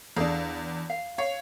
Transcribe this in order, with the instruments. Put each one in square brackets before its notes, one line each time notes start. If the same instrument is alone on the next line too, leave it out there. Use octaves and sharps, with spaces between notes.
[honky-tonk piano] E2 D4 [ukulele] G#4 A4 F5
[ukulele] F5
[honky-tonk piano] C#5 [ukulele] F5